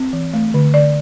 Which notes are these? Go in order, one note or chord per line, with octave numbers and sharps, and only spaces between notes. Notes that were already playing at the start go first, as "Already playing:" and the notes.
Already playing: C4
E3
A3
D3
D3 D5